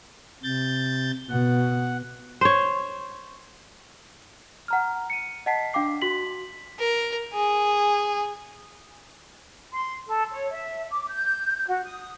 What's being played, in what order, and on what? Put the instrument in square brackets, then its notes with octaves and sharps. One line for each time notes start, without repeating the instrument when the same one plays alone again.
[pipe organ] C3 G6 A6
[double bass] B2 [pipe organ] F#5
[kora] C5 C#5
[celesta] F#5 A#5 F6
C#7 D#7
D#5 F#5 A5 B6 C7
D4 F5 G5 D6 C7
F#4 C6 B6 F#7
[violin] A#4
G#4
[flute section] C6
A4
C#5
E5
D6
G6
F#4
D#6